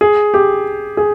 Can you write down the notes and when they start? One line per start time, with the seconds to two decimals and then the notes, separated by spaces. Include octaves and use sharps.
0.01 G#4
0.34 G4
0.97 G#4